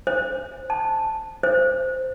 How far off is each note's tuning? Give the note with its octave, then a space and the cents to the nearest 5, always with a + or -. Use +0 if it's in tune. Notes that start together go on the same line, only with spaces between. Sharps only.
C5 +0
A5 +0
C5 -10